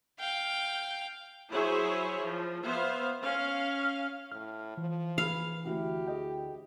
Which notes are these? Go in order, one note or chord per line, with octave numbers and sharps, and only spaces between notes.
F5 G5
F#3 E4 G#4 C5 C#5 E5
F3
B3 C5 E5 F5
C#4 F5
A2 F6
E3 F3
G#4 B4 F5
D2 E4 F#4 G4
G#4 D#5 G5